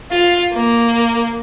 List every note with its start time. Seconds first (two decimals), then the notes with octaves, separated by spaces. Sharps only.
0.11 F4
0.53 A#3